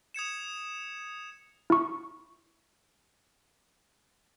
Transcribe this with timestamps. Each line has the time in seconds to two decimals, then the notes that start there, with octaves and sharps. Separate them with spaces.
0.14 D#6 G#6 C#7 E7
1.70 E4 C#6